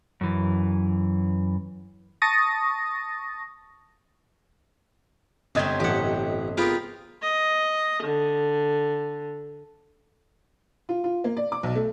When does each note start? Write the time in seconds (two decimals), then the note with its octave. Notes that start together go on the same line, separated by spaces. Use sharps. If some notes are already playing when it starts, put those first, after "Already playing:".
0.21 F#2 E3
2.22 A5 C#6 D#6 A6 A#6
5.55 G1 C3 F#3 C4 D#5 G#6
5.80 A1 G4 A4 F#5
6.57 B3 F4 G4 G#4 A#4
7.22 D#5
8.02 D3
10.89 F4
11.04 F4
11.24 A#3
11.37 D5
11.52 D6
11.63 B1
11.76 A3